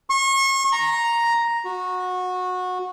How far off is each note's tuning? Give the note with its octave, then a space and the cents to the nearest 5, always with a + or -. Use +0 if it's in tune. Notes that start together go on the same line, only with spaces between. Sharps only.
C#6 -35
A#5 +0
F#4 -20